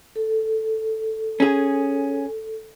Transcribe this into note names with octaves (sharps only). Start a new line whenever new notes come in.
A4
C#4 G#4